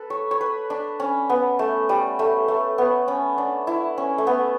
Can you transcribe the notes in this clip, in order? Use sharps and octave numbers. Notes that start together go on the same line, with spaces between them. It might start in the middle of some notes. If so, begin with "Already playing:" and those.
Already playing: A4 B4
C#5
C#5
B4
D4
C#4
B3
A3
G3
A3
A3
B3
C#4
D4
E4
C#4
A3
B3